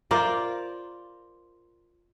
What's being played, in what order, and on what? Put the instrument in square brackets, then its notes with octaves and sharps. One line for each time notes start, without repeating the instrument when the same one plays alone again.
[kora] F4 A#4 C5 D5